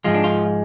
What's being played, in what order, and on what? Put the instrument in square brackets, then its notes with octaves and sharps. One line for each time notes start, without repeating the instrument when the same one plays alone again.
[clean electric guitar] G#2 F3 G#3 F4
D4
F4